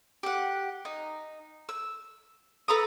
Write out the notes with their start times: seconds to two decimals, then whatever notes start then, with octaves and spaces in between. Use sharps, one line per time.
0.23 G4 F#5
0.85 D#4
1.69 E6
2.68 A4 B4 A#5 D#6